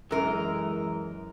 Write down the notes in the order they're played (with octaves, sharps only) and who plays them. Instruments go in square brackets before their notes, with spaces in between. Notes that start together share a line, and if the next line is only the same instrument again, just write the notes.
[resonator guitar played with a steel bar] F#2 A#4 [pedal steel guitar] E3 G#3